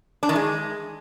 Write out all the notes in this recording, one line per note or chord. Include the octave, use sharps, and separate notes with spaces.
D4
D#3
G#3